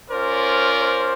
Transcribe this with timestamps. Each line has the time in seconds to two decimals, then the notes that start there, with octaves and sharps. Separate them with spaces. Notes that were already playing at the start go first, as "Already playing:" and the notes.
0.10 C#4 F4 A#4 C5 D5
0.80 C5